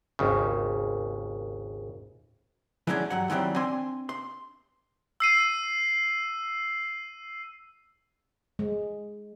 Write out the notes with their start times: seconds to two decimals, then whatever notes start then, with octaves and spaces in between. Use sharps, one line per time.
0.19 G#1 D#2 C#3
2.87 E3 F#3 G#3 A3 C#4 D4
3.10 G2 F#3 F#5
3.30 D#3 E3 F#3 G3 C4
3.56 C4 D4 G#5 C6
4.09 C6
5.20 E6 C7 D#7
8.59 G#3